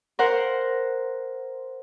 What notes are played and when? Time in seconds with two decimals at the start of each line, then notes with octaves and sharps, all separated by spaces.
0.19 A#4 C5 F#5 C6